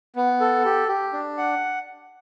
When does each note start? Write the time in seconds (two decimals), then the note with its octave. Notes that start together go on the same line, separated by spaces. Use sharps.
0.16 B3
0.40 A4
0.65 G4
0.88 G4
1.13 D4
1.38 F#5